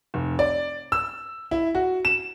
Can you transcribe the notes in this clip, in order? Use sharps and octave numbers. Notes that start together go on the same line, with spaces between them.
F1
D5
E6
E4
F#4
E7